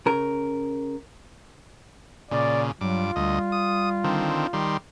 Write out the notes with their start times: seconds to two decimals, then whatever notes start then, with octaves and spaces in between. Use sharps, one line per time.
0.06 C#3 A#4
2.31 A#2 C#3 D5
2.81 G2 F#3 F4 D6
3.16 D2 G3 D#5
3.52 D#6
4.04 D3 D#3 C4
4.53 D#3 G3 C6